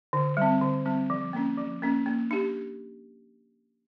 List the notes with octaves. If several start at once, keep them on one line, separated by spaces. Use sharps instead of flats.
D3
G3 C4
D3
G3 C4
F3
A#3 C#4
F3
A#3 C#4
A#3
D4 G4